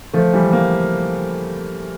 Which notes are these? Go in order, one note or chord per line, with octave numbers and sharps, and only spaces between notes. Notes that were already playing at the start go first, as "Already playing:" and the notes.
F3 A3
E3 G3
G3 A#3